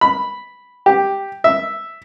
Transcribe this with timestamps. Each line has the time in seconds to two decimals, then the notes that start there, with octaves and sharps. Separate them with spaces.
0.01 B5
0.86 G4
1.44 E5